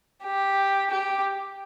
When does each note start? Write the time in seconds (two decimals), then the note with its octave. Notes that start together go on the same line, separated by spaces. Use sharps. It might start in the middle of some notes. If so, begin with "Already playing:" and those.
0.23 G4
0.91 G4